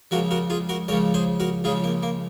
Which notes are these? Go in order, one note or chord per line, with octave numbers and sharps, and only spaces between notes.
C#2 C#3 F3 F#4 A#4
F#4 A#4
F4 G#4
F#4 A#4
C#2 C#3 F3 A#4 C#5
G#4 C5
F#4 A#4
C#2 C#3 F3 F4 G#4
A#3
A#3